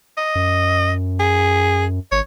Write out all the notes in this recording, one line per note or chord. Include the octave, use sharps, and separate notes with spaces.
D#5
F#2
G#4
G#1 C#5